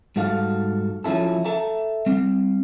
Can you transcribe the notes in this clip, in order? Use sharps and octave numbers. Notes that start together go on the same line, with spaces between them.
G#2 G3 F#4 A4 F5
F3 F#3 C#4 E4 A4
A4 E5 A5 A#5
G3 C4